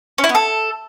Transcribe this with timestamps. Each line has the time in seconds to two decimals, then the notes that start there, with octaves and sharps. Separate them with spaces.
0.18 C#4
0.24 E4
0.29 B3
0.35 A4